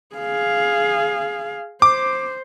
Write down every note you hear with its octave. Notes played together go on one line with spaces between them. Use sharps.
G#4 F5
C5 D6